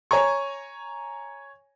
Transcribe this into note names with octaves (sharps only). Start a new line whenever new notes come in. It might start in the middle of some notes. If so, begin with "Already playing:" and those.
C#5 G#5 A#5 C#6